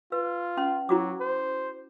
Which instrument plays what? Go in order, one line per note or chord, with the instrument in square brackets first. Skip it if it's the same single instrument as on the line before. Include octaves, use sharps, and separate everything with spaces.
[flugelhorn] F4 [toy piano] B4
[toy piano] C#4 C6
[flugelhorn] F#3 [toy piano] E4 F#4 D6
[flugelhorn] C5